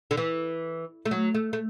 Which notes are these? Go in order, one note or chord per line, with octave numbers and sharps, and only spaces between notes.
D3
E3
A3
F#3
A3
A3